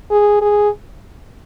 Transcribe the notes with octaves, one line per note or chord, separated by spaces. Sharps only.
G#4
G#4